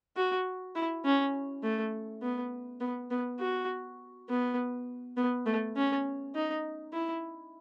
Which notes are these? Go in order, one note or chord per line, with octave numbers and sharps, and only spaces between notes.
F#4
E4
C#4
A3
B3
B3
B3
F#4
B3
B3
A3
C#4
D#4
E4